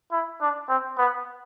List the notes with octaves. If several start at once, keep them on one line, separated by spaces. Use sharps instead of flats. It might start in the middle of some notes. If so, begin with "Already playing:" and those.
E4
D4
C4
B3